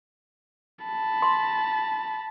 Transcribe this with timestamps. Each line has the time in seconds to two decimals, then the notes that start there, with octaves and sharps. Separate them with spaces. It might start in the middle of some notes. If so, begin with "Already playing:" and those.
0.85 A5 B5
1.22 C6